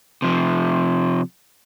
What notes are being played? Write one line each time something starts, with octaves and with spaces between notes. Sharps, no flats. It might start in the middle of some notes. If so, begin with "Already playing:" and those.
C3 F3